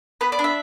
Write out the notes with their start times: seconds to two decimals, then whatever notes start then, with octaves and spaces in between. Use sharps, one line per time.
0.21 B3 B4
0.32 D5
0.39 D4
0.44 E5